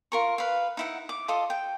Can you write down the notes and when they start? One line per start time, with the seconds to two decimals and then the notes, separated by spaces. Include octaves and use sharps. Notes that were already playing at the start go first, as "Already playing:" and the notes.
0.12 F4 A#4 C#6
0.38 B4 F5
0.77 D#4 E4 F#5
1.09 D6
1.28 F4 A4 D#5 D#6
1.50 G5